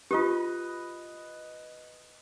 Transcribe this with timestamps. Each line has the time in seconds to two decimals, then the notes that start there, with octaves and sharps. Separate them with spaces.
0.11 F4 G4 B4 D#5